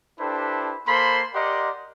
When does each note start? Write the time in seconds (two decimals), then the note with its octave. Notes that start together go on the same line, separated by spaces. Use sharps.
0.20 D4 E4 G4 A4 B4 C5
0.88 A#3 A4 C5 B5 C6
1.35 G4 A#4 D5 D#5 F#5 C6